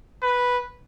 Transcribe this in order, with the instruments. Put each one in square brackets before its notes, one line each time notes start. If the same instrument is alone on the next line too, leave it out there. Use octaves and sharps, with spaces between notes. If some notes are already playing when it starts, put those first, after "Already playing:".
[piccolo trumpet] B4